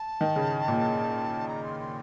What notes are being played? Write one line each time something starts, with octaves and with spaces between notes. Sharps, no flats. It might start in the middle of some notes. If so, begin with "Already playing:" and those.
Already playing: A5
D#3
C#3
A#2
A#5
C6
C6